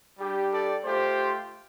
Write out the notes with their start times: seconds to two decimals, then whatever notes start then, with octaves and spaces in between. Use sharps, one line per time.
0.18 G3 D4 G4
0.52 A4 D5
0.84 A3 F4 G4 C5